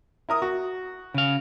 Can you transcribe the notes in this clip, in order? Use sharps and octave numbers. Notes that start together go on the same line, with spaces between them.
E4 A#4 D#6
F#4
C#3 F5